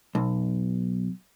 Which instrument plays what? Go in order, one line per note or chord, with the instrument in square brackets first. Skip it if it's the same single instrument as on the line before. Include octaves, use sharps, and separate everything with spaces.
[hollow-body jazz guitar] B1